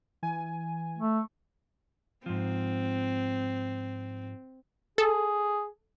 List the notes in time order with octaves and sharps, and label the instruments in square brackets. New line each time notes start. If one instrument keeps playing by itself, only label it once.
[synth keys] E3 G#5
[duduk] A3
[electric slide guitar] G#2 F3 [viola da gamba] C4
[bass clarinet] G#4 [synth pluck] A4